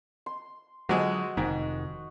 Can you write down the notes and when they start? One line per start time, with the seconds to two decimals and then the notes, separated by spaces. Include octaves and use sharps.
0.26 C6
0.89 D3 F3 F#3 G#3 F#4 D#5
1.37 F1 G#2 D#3